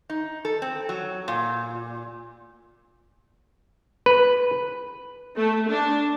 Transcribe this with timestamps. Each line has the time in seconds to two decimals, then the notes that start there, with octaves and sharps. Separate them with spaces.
0.10 D#4
0.45 A4
0.62 C4
0.89 F#3
1.28 A#2
4.06 B4
5.38 A3
5.70 D4